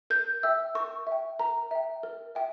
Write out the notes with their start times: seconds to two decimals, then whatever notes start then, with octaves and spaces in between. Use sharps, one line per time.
0.10 A#4 G6
0.43 E5 G5 E6
0.75 A#4 C#6
1.07 E5
1.12 G5
1.39 A#4 A#5
1.71 E5 G5
2.03 A#4
2.35 E5 G5